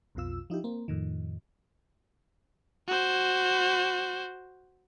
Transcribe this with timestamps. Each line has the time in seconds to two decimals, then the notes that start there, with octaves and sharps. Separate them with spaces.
0.15 B1 F2 B2 F4 E6
0.50 F3 D#4 E4 G4
0.64 A#3 C4
0.88 F2 A2 D#3
2.88 F#4 C5